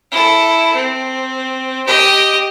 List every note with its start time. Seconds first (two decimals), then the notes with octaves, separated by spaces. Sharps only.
0.11 E4 A4
0.74 C4
1.87 G4 D#5